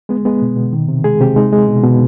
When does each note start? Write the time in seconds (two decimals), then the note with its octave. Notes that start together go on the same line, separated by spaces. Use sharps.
0.09 G#3 B3
0.25 G#3 B3
0.42 B2
0.57 B2
0.73 D#3
0.88 C3
1.04 G#3 G#4
1.20 C3 G4
1.36 G#3 D#4
1.52 G#3
1.68 B2
1.84 B2